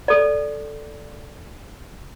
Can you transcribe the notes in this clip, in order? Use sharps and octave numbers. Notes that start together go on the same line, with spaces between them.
A4 D5